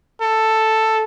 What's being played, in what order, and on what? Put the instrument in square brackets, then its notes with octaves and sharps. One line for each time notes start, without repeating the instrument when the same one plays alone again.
[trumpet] A4